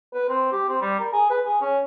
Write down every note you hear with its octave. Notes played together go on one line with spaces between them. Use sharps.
B4
C4
G4
C4
G3
A#4
G#4
B4
G#4
C#4